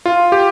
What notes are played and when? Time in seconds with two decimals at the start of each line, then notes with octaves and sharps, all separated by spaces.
0.06 F4
0.32 G4